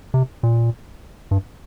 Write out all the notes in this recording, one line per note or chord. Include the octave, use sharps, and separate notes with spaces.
C3
A#2
G2